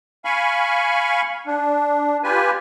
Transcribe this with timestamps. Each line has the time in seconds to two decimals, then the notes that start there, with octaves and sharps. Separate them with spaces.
0.25 F5 G#5 B5 C#6
1.47 D4
2.24 F4 G4 B4 G#5